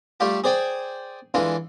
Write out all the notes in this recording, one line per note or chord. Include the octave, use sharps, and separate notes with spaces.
G3 A3 F4 G4 A4
G#4 C5 D5 G5 G#5
E3 G#3 D4 F4 A4